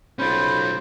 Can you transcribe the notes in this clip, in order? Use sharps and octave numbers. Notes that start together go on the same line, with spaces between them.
B1 C#4 F4 C5 B5